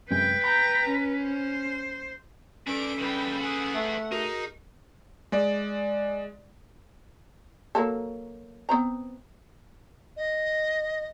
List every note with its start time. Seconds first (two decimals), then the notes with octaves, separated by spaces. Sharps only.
0.11 F#2 C3 G#3 B4 G5
0.44 G5 A#5 B5
0.89 C#4
1.23 C5
2.67 C#4 A4 B4 D5 D7
2.98 C#3 G3 B4 G5
3.41 B3 G#4 F#5
3.75 A3
4.12 D#4 F#4 G#4 A#4
5.32 G#3 D5
7.75 F#3 A#3 A4
8.69 B3 C4 A#5
10.17 D#5